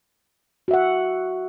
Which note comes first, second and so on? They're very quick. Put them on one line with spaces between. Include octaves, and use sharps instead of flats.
F#4 E5 F#5